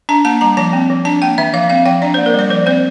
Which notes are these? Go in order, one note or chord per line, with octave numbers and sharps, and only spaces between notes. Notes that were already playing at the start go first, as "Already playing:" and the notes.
D4 A5
A#3 A5
G3 A#5
F3 A5
C4
F3
D4 A5
A#3 G5
E3 E5
F3 F5
C4 F5
F3 G5
D4 D5
C5
A#3
A#4
G3 D5
F3 C5
C4 C5